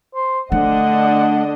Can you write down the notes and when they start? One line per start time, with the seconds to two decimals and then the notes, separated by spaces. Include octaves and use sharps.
0.15 C5
0.52 D3 A3 D4 D#5 F#5